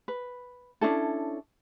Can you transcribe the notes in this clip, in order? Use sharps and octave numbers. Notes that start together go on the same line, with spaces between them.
B4
C#4 D4 E4 A4